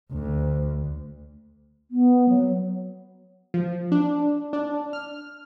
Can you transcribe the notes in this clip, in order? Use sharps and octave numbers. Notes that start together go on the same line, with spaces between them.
D2
B3
F#3
F3
D4
D4
F6